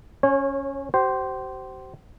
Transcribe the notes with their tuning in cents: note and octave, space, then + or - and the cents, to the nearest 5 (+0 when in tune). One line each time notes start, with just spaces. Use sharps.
C#4 +0 C#5 -30
G4 -45 C5 -5